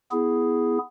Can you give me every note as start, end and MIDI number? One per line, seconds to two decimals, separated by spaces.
0.12 0.78 59
0.12 0.78 64
0.12 0.78 68